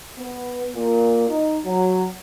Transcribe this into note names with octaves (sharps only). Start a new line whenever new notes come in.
B3
A#2
D#4
F#3